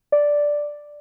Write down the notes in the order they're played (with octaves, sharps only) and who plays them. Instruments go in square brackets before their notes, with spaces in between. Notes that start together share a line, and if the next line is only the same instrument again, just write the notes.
[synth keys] D5